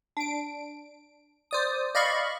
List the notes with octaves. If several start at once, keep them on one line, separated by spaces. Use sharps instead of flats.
D4 D7
C5 D5 D#6
D5 D#5 F5 B5 C#6